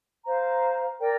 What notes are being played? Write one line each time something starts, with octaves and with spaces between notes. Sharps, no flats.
C5 F5 A#5
A#4 D5 G5